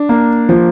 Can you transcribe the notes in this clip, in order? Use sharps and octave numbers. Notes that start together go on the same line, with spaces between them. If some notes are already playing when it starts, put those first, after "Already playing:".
Already playing: D4
A#3
F3